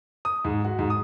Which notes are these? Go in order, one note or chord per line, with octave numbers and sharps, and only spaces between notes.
D#6
G#2
F#4
G#2
D#6